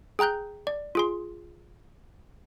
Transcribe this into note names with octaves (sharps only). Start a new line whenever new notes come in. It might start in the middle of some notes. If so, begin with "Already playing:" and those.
G#4 G5 A#5 F#6 G6
D5
F4 G#4 C6